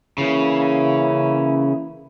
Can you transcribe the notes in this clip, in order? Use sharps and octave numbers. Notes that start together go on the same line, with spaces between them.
C#3 E3 A#3 E4